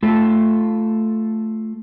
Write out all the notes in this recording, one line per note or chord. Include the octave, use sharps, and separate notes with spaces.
A3 F4 A4